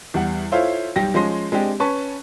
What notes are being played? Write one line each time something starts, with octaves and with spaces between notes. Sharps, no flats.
E2 G3 F#5
E4 F4 A4 C5 C#5 F5
B1 G3 G4 A#6
F3 G#3 C#4 C6 A#6
G#3 C4 D4 G4
C#4 B4 A5 C#6